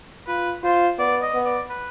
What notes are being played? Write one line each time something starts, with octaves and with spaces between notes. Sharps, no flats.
F4 B4
F4 C5
B3 D5
D#5
B3
D5
B4